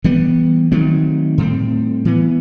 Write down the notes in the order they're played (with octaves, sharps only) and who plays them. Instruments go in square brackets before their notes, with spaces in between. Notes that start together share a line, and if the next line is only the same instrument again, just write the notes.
[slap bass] E3 G3 B3
D#3 F#3 A3 C4
A2 G3 C4
E3 B3